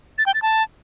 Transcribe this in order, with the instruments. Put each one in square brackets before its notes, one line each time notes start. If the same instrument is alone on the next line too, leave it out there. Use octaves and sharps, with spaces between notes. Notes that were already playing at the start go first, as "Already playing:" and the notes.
[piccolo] A6
G5
A6
A5